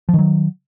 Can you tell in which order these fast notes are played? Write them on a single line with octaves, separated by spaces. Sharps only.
F3 D#3 F#3